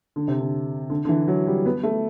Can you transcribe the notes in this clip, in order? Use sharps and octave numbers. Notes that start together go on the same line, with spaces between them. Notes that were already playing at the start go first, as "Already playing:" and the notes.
D3
C3
D3
D3
D3
E3
F#3
G3
B3
A3